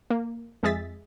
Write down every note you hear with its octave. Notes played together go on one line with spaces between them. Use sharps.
A#3
F2 G#3 G#4 E5 A6 B6